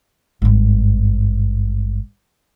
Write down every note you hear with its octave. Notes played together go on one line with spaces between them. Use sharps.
G#1 G2